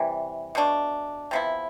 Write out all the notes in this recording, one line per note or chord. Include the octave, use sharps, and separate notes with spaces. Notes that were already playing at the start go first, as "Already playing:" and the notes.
Already playing: C3 E3 G3
B2 A3 D4
C3 F3 B3 E4